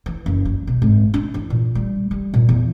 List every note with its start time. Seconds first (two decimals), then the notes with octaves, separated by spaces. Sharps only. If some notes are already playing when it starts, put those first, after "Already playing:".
0.06 E3
0.26 F#1
0.45 F#3
0.67 B2
0.82 G#1
1.14 D4
1.34 E3
1.50 A#2
1.75 G3
2.11 G3
2.34 A#2
2.49 E2